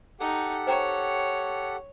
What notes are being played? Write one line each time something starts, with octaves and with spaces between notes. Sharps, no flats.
D#4 G4 A4 F#5
C5 C#5 G5 A#5